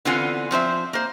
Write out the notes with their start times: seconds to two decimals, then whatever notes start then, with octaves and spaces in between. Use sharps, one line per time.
0.05 D3 E3 B3 C4 F4 G#5
0.51 F3 C4 C5 E5
0.93 A#3 C5